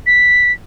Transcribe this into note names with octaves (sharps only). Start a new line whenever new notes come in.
B6